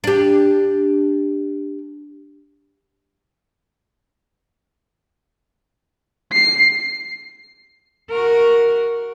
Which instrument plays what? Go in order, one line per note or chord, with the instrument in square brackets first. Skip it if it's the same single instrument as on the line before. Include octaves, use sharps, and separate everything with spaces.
[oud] D4 G4
[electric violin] C7
[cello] F#4 A#4